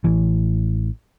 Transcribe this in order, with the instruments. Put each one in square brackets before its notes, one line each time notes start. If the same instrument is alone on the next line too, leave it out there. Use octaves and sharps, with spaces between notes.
[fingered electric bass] A1 E3